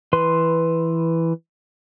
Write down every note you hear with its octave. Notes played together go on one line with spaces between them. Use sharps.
E3 B4 C6